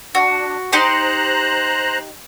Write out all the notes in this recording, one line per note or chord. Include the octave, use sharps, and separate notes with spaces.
D4 F#4
D#4 G4 C5 A#5 C6 F#6